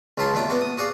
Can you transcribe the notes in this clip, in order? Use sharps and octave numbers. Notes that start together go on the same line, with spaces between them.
C#2 F#3 F4 A5 B5 C6
D#2 D4 E4 F4 D6
B3 D4 F#4
D#6
F#4 G#4 D5 F5